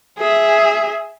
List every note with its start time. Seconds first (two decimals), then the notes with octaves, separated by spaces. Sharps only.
0.19 G#4 E5